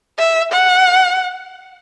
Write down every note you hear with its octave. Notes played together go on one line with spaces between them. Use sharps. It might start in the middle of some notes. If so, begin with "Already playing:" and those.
E5
F#5